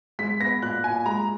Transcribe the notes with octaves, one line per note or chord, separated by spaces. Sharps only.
G#3 B6
B3 A#6
A#2 F#6
A#2 G#5
G#3 A#5